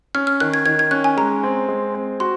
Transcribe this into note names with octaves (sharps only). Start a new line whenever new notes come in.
C#4 F6
F6
D#3 F#6
G#6
D#3 G#6
G#6
C#4 F#6
G#5
G#3 A#5
C4
G#3
C4
F#4 C6